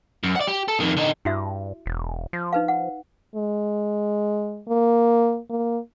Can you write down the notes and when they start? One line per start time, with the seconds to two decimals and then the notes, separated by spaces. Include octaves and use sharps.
0.23 F#2
0.36 D5 F#5
0.47 G4
0.68 A4
0.80 F2 D#3
0.97 D3 D#4
1.25 G2 E4 F#4 E5
1.86 E1
2.33 F3
2.53 D#4 B4 F5
2.68 F#5
3.36 G#3
4.68 A#3
5.50 A#3